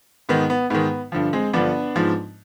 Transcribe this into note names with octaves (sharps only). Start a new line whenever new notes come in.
G#2 D#3 B3
B3
G#2 D#3 B3
G2 D3 F3
G#3 C4
G2 D3 F3 B3 D4
G#2 F3